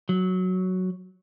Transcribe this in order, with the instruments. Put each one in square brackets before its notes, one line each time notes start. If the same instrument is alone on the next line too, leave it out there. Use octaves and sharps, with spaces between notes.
[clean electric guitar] F#3